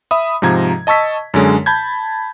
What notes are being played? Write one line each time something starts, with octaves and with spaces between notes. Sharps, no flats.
E5 B5 D#6
G#2 C3 F3 A#5 G#6
D#5 A5 C#6 E6 B6
F#2 D3 G#3 C#4
A5 B5 G6 G#6